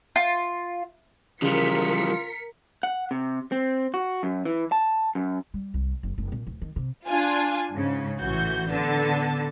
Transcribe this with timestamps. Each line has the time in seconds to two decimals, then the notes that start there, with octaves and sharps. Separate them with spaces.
0.16 F4
1.42 C#3 E3 F3 G3 F4 A#4 B6 C#7
2.83 F#5
3.11 C3
3.52 C4
3.94 F#4
4.23 F#2
4.45 E3
4.72 A5
5.15 F#2
5.54 G3
5.74 C2
6.03 F#1
6.18 F#1
6.32 A#2
6.47 D1
6.62 D#3
6.76 C3
7.07 D4 F4 G#5
7.73 G#2 C#3
8.20 A1 E3 F#4 G6
8.70 D3 B3 A5